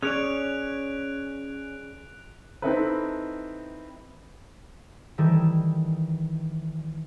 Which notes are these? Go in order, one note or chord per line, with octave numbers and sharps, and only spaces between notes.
C#4 G#4 C#5 D5 F#6 D7 F7
C4 D#4 E4 A4 B4
D#3 E3 G3 E4 A4